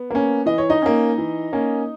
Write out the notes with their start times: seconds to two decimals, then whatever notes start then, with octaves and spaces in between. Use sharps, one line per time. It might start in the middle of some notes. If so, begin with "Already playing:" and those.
Already playing: B3
0.11 A#3 C#4
0.46 E3 D#5
0.58 C#5
0.70 D#4 D#5
0.82 A#3 C#4
1.18 E3
1.53 A#3 C#4